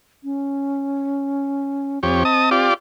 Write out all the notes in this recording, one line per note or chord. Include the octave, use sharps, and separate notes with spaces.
C#4
F2 C4 G4 C#5
D#5 A5 D#6
F4 G4 D5